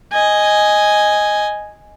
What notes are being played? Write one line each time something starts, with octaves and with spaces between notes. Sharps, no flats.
D#5 G#5